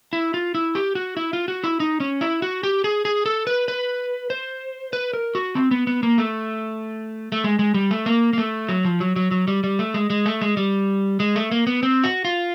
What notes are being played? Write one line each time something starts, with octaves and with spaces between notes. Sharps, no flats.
E4
F4
E4
G4
F#4
E4
F4
F#4
E4
D#4
C#4
E4
F#4
G4
G#4
G#4
A4
B4
B4
C5
B4
A#4
F#4
C4
B3
B3
A#3
A3
A3
G#3
G#3
G3
A3
A#3
A#3
A3
F#3
F3
F#3
F#3
F#3
G3
G3
A3
G#3
G#3
A3
G#3
G3
G#3
A3
A#3
B3
C4
F#4
F4